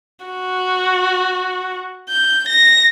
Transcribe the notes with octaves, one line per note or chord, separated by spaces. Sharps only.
F#4
G6
A#6